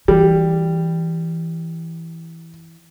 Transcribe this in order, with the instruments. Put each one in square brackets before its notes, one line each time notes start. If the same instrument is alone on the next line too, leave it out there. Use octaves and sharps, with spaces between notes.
[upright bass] E3 [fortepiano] G3